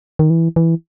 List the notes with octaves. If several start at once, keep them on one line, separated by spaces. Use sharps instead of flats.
D#3
E3
E3